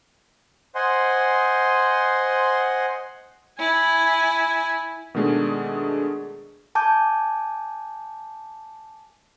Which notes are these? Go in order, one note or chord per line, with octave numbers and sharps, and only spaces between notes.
C5 D#5 F#5 G#5 C6
E4 G#5
B2 D#3 G#3 A3 D4 G#4
G#5 A5 D6 G6